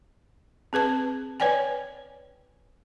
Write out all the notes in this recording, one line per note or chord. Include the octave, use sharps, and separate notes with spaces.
C4 G#4 B4 A5
B4 C#5 D5 G5 G#5